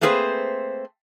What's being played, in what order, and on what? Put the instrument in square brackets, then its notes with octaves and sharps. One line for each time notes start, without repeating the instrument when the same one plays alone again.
[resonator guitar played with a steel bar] A3 A#3 C4 G#4 B4 C5